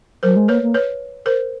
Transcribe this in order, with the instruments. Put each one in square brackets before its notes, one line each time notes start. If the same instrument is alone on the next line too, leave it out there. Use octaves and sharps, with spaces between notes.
[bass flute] F#3 [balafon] A#4 C5
[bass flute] G#3
[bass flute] A#3 [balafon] B4 C#5
[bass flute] A#3
[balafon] B4 C#5
A#4 C5